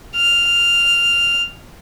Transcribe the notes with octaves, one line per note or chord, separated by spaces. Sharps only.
F6